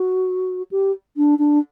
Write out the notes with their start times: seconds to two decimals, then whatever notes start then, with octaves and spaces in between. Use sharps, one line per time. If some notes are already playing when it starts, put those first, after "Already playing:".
Already playing: F#4
0.71 G4
1.17 D4
1.39 D4